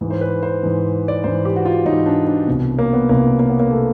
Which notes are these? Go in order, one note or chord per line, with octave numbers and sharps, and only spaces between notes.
G#2 E3
C5
B4
C5
G#2 E3
D5
G#2 E3 C5
G4
F#4
F4
G#2 E3 D#4
D4
D4
C2 B2
A#3
B3
C2 B2 A#3
A#3
B3
A#3
B2 A3